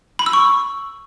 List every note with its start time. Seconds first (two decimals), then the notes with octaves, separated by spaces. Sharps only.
0.19 B5
0.26 E6
0.33 C#6